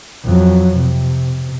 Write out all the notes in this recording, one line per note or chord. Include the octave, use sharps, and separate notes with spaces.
F2 F#3
C3